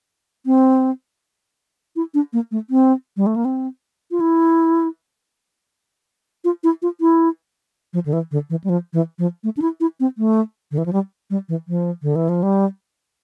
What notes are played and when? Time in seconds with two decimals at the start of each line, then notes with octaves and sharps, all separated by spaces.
0.46 C4
1.96 E4
2.14 D4
2.33 A#3
2.51 A3
2.70 C4
3.17 G3
3.26 A3
3.36 A#3
3.45 C4
4.11 F4
4.20 E4
6.44 F4
6.64 E4
6.82 F4
7.01 E4
7.93 F3
8.06 D3
8.13 E3
8.31 D3
8.50 E3
8.64 G3
8.69 F3
8.93 E3
9.19 F3
9.44 A3
9.57 D4
9.62 E4
9.80 E4
10.00 C4
10.18 A3
10.71 D3
10.78 E3
10.86 F3
10.93 G3
11.30 G3
11.49 E3
11.68 F3
12.02 D3
12.16 E3
12.29 F3
12.43 G3